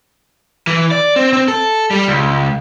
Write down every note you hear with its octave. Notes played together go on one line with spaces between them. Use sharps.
E3
D5
C4
C4
A4
G3
C#2